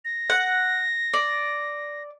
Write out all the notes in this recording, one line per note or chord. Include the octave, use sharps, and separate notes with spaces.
A#6
F#5
D5